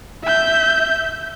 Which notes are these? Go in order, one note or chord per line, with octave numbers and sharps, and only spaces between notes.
E5 G6